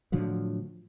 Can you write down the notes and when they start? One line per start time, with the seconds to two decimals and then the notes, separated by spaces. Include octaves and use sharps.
0.12 A2 D3 F3 F#3